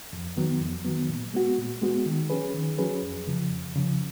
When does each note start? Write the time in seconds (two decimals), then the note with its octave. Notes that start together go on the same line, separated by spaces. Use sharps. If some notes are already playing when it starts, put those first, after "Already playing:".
0.13 F2
0.37 D#3 F#3 B3
0.61 F2
0.85 D#3 F#3 B3
1.09 A#2
1.34 G#3 B3 F#4
1.58 A#2
1.82 G#3 B3 F#4
2.06 D#3
2.30 F#3 C#4 G#4 B4
2.54 D#3
2.78 F#3 C#4 G#4 B4
3.03 F2
3.27 C#3 F3
3.51 F2
3.75 C#3 F3